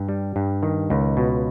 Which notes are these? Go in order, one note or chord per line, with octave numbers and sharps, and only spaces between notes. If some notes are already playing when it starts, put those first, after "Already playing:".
Already playing: G2
G3
G2
D#3
C#2
B2